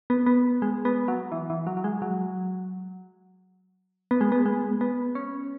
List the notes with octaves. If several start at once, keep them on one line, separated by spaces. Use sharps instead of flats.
B3
B3
G#3
B3
F#3
E3
E3
F#3
F#3
G#3
F#3
B3
G#3
B3
G#3
B3
C#4